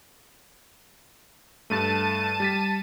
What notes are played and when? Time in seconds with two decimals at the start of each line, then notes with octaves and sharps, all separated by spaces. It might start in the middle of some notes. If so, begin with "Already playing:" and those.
1.70 G2 A3 A5 D#7
2.40 G3 A6 B6